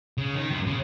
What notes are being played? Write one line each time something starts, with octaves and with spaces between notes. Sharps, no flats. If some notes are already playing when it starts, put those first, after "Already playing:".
C#3
D#3
F#2
C#3